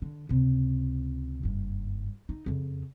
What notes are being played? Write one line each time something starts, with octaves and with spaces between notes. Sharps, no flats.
D3
C#2 C3
F#1 G2
D#4
F2 C#3